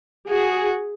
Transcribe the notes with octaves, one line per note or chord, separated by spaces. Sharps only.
F#4 G#4